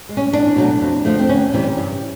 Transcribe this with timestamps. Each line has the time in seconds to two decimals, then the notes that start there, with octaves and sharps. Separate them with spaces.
0.09 G#3
0.17 C#4
0.33 E2 D4
0.56 B2 F#3 A3
0.81 F2
1.05 D3 F3 A3
1.19 C4
1.29 D2 C#4
1.53 C3 E3 G3
1.77 G2